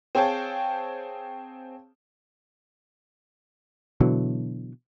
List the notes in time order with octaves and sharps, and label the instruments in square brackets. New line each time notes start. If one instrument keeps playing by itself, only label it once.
[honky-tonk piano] C4 G#4 C#5 F5 G5 A5
[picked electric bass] B2 D3 E3 F#3